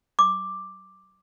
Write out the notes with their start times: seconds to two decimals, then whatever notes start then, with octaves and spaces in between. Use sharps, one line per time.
0.19 D6